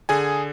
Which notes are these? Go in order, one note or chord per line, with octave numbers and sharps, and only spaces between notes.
D3 G#4 G#5